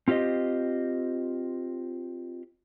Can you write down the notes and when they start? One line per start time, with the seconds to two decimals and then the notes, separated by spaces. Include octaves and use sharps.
0.08 C4 F4 G4 C5 D#5